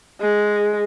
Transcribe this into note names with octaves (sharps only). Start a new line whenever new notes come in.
G#3